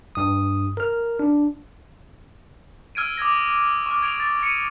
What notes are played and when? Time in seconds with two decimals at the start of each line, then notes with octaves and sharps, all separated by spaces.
0.15 G2 D#6
0.77 A#4 F6
1.19 D4
2.95 E6 F6 G#6 D7 D#7
3.17 D6 D#6 G#6 A#6
3.86 C#6 D6 F6
4.02 G#6 D7 F7
4.20 A6
4.43 C#7 D#7